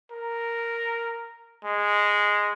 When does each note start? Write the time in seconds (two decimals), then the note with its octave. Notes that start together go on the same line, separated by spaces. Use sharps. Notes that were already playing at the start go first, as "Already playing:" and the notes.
0.11 A#4
1.64 G#3